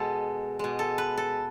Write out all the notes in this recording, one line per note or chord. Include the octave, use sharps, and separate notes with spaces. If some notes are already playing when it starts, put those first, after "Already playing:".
Already playing: B2 G#3 A4
B2 G#3
A4
B4
A4